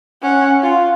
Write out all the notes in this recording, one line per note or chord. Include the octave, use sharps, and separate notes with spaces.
C#4 F#5
F4